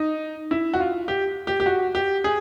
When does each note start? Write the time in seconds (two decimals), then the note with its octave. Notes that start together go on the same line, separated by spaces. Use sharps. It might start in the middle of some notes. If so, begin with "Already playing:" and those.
Already playing: D#4
0.51 E4
0.74 F#4
0.80 F4
1.08 G4
1.47 G4
1.60 G4
1.66 F#4
1.95 G4
2.24 G#4